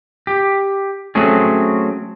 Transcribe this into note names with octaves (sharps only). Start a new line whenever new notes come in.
G4
F#3 A3 C4 C#4 G#4